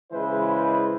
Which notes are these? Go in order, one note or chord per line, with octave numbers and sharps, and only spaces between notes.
C#3 E3 G#3 E4 B4 C5